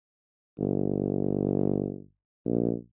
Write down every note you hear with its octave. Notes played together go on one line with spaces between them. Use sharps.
G1
A#1